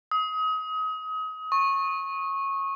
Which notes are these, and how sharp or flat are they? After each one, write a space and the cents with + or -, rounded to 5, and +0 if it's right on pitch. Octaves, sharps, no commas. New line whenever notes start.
D#6 +30
C#6 -20